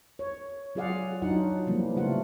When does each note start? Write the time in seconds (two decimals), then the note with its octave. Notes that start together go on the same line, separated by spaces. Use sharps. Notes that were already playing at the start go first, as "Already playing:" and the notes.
0.19 C#5
0.75 F#3 F4 G#4 D5 F5 F#5
1.22 F#3 D4 D#4 F4 F#5
1.67 C3 E3 F3 G3 A#3
1.96 C#3 A3 F4 F#5